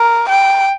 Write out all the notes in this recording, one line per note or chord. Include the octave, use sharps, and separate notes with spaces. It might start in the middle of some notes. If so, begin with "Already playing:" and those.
Already playing: A#4
G5